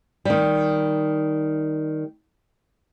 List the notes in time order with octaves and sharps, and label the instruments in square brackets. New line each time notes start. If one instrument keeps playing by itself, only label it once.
[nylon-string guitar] D#3 G3